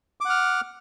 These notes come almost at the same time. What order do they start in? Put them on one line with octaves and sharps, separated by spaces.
D6 F#5 F6